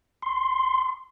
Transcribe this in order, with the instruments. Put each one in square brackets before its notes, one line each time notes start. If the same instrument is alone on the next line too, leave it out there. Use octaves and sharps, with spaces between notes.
[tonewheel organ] C6